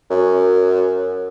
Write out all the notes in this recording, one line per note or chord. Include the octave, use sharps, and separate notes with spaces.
F#2